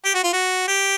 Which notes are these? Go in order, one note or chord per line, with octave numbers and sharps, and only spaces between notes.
G4
F#4
F4
F#4
G4